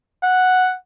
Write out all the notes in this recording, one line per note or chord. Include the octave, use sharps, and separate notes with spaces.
F#5